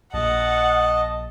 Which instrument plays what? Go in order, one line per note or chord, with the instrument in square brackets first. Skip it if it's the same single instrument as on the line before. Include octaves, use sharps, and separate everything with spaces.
[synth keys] A#1 [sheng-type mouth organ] D#5 A5 [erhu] F#5